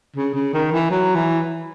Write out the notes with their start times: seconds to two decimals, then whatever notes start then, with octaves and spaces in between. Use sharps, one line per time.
0.16 C#3
0.34 C#3
0.53 D#3
0.72 E3
0.90 F#3
1.15 E3